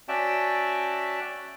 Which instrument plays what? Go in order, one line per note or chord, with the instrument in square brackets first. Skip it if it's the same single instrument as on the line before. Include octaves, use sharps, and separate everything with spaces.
[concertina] C#4 F#4 D5 E5 G5 A5